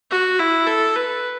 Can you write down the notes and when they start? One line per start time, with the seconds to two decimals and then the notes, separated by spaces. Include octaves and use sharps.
0.11 F#4
0.39 E4
0.67 A4
0.96 B4